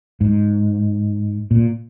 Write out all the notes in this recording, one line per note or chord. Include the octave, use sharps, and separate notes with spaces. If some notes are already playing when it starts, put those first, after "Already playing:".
G#2
A#2